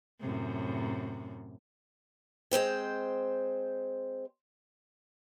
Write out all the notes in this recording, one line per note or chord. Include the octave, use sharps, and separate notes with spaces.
F#2 A2 C3
G#3 C4 C5 G5